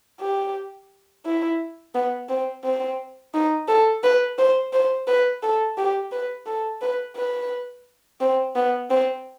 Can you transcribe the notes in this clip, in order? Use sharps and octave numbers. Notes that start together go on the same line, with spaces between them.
G4
E4
B3
C4
C4
D#4
A4
B4
C5
C5
B4
A4
G4
B4
A4
B4
B4
C4
B3
C4